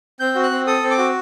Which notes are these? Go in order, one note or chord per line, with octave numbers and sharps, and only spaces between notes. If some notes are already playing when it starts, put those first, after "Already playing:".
C4 G6
F#4
F#6
C4
A4 D#6
C4
D6
F#4